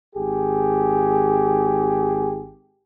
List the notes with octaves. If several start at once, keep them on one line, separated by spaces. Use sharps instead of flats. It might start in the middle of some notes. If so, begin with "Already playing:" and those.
G#1 G4 G#4